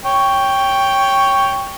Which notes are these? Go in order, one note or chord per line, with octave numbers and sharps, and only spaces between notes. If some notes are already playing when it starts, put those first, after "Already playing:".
C#5 G5